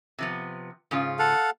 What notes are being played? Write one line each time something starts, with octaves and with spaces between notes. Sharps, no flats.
C3 F3 B3
G#2 C#3 F4
A4 F5 F#5